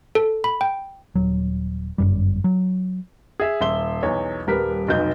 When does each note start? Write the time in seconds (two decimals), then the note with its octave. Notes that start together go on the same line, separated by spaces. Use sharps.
0.15 A4
0.44 B5
0.61 G5
1.15 D#1 F#3
1.98 G1 F#2 G3
2.44 F#3
3.40 G#4 E5
3.61 D#1 E5 C6 G7
4.03 B1 E2 C#5
4.47 D#1 G3 A#4 B4 B6
4.88 F1 B1 F#3 D#4 G6